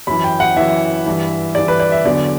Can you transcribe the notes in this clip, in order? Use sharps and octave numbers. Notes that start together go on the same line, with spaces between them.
F#2 E3 B5
G5
F#5
F#2 E3 E5
G2 E3
G2 E3 D5
B4
D5
E5
E2 D3 F#3 D5